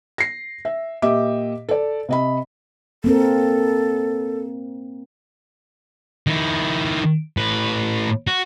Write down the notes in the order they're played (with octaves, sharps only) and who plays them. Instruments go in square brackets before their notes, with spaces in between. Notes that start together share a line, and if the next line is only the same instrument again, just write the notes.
[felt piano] A#6 C7
E5
A#2 G4 D#5 E5 D6
A4 D5
C3 D#5 B5
[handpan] A#3 C4 A#4 [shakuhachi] A4
[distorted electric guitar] D#3 E4
A2 B4
F#4